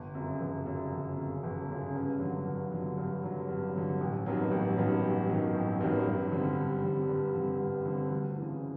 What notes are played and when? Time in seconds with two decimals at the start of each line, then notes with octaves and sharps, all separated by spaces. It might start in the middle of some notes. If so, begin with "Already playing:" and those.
Already playing: G1
0.15 F#2 C#3
0.40 G1
0.66 F#2 C#3
0.92 G1
1.17 F#2 C#3
1.43 G1
1.69 F#2 C#3
1.95 G2
2.20 D3 F#3
2.46 G2
2.71 D3 F#3
2.97 G2
3.23 D3 F#3
3.49 G2
3.75 D3 F#3
4.00 A1
4.26 G2 D#3 F#3 B3
4.51 A1
4.77 G2 D#3 F#3 B3
5.03 A1
5.29 G2 D#3 F#3 B3
5.54 A1
5.80 G2 D#3 F#3 B3
6.06 G2
6.32 D3 G3 C4
6.58 G2
6.84 D3 G3 C4
7.09 G2
7.34 D3 G3 C4
7.61 G2
7.85 D3 G3 C4
8.11 D2
8.37 C#3 E3